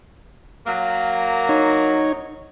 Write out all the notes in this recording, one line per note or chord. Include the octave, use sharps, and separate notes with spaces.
F#3 A#3
D#4 C#5